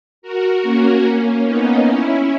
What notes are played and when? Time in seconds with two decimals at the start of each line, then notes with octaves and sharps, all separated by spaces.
0.22 F#4 A#4
0.62 A#3 C#4
1.03 A#3 C#4
1.44 B3 D#4
1.85 C#4 E4